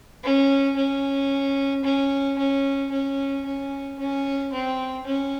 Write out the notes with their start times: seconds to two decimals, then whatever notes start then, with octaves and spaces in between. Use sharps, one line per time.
0.23 C#4
0.76 C#4
1.84 C#4
2.38 C#4
2.92 C#4
3.46 C#4
3.99 C#4
4.53 C4
5.06 C#4